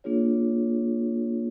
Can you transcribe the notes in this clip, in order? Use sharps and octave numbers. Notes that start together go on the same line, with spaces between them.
A#3 D4 F4 G#4 C#5